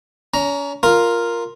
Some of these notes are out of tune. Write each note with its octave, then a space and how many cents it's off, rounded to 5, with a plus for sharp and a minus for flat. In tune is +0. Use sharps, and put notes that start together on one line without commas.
C#4 +35 A#5 +5
F4 +0 A#4 +0